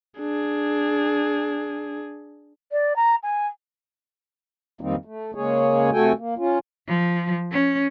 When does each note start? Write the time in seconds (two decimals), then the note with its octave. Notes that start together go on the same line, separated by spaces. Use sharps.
0.20 D4 G#4
2.72 D5
2.96 A#5
3.23 G#5
4.81 F2 D#3 G3 A#3 C4 D#4
5.05 A3
5.35 C#3 G#3 A#3 G#4 C#5
5.93 C3 A3 F#4 A4 G5 G#5
6.18 A#3
6.38 C#4 F4
6.88 F3
7.52 C#4